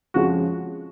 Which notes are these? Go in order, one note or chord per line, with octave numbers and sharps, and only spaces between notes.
F2 C#3 F3 G#3 F#4